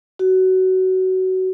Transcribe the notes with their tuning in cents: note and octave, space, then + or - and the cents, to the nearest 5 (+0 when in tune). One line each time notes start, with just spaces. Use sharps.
F#4 +20